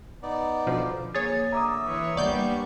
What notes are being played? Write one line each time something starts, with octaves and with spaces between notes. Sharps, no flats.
B3 D#4 D5
B2 D3 F3
A#3 G#4 C#5 G#5 A6
D3 E5 A#5 D6 D#6
E3 B4 C#5
C#2 G3 A#3 B3 D4 D5 C#6 G6